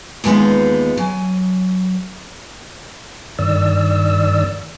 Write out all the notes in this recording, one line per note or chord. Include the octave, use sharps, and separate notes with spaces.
D#2 E3 G#3 B3 D#4 F4
F#3 G#5
G2 D#3 D5 E6